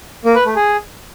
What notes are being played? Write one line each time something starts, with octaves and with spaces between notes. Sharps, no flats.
A#3
B4
A3
G#4